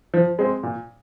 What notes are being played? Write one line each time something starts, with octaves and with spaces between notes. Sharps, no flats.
F3
G#3 C4
A#2